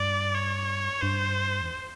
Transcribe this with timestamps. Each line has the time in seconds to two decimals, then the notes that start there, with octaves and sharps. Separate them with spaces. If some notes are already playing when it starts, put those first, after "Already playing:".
Already playing: G2 D5
0.34 C#5
1.02 G2 C5
1.61 E2